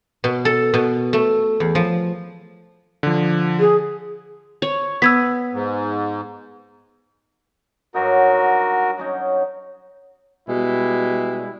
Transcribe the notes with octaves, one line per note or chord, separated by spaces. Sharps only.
B2
A4
B2
A3
E2
F3
D3 F3
G#4
C#5
B3 E6 G#6 B6
G#2
G2 F#3 D#4 F#4 A#4
F#3 C#4 D#4
B2 G3 G#3 E4